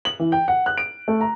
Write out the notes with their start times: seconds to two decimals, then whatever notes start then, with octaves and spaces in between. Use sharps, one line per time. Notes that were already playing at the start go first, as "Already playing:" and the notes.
0.05 F#7
0.19 E3
0.32 G5
0.48 F#5
0.66 F#6
0.78 D7
1.08 A3
1.21 A#5